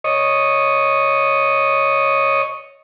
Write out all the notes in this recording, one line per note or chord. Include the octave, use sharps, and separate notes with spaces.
C#5 D#5